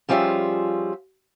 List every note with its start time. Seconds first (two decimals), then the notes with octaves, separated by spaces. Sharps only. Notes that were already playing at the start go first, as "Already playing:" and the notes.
0.09 F3 G3 C#4 F4 G#4 E5